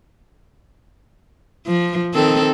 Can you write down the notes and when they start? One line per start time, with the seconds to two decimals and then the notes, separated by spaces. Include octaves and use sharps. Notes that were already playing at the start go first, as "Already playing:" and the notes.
1.67 F3
2.14 D#3 C4 A4